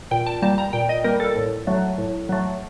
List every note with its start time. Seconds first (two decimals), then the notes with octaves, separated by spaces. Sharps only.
0.11 A#2 G5
0.27 A5
0.42 G3 A#3 A5
0.58 A#5
0.73 A#2 G5
0.89 D#5
1.04 G3 A#3 A#4
1.20 A4
1.36 A2
1.67 F#3 A3
1.98 A2
2.29 F#3 A3